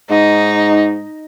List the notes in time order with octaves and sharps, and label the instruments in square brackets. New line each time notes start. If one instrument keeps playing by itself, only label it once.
[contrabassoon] G#2 [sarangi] D#4